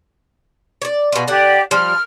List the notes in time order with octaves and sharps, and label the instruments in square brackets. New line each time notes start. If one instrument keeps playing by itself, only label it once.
[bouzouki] C#5 D5
B2 F4
[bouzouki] D3 F#5 [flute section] G4 D5
[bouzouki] F3 G3 [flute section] F6